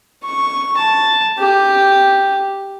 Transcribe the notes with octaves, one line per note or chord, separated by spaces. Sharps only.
C#6
A5
G4